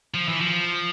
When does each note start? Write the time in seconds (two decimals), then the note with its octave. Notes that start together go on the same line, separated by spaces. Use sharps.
0.14 F3
0.28 E3
0.41 F3